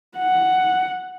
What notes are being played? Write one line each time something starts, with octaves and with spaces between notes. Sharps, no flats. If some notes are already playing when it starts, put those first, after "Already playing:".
F#5